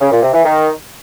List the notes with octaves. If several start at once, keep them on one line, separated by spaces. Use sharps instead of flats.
C#3
A#2
C3
E3
D#3